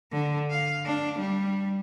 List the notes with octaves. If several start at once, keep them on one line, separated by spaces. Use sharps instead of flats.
D3
F5
D4
G3